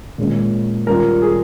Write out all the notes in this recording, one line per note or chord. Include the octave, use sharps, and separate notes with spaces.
A#2 G#3 C#4
G3 C#4 F4 A#4
G#4